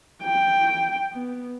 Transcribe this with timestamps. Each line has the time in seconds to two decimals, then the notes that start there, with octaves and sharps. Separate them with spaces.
0.22 G5
1.13 B3